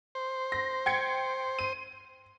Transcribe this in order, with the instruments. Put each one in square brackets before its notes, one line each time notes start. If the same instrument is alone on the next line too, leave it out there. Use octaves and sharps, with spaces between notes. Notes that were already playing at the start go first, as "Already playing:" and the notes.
[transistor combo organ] C5
[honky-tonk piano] A#6
G5 G#6 C#7
D#7